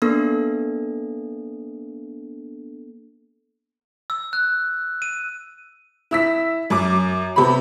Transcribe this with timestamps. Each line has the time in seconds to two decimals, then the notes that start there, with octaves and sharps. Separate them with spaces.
0.02 A#3 B3 D4 A4
4.10 E6
4.33 F#6
5.02 D#7
6.11 E4 E6 B6
6.70 F#2 D6
7.36 C3 B3 B5